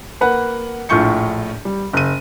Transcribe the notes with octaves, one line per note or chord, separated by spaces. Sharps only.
A#3 B4 F#5
A#1 A2 F4 C#6 G6 C#7
G3
F#1 D#7